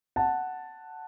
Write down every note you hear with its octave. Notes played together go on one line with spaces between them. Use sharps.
F#5 A5